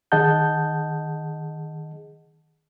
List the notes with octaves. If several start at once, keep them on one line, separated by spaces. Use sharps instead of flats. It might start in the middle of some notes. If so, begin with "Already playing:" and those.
D#3 G#4 D#5 F#5 A5 G6